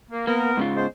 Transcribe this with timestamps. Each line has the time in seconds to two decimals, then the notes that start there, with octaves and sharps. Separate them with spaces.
0.10 A#3
0.27 A#3 B3 A#4
0.57 G#2 C#3 F4
0.76 G#3 B3 C5